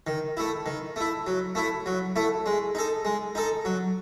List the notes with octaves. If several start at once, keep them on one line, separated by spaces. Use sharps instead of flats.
D#3
A3 E4
D#3
A3 E4
F#3
A3 E4
F#3
A3 E4
G#3
D#4 A4
G#3
D#4 A4
F#3